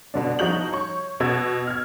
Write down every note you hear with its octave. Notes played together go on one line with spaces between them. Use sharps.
B2 D3 D4
C2 F3 D#4 F#4 G6 F#7
C#5 C#6
B2 F#4 E6 G#6 A6
F6 G#6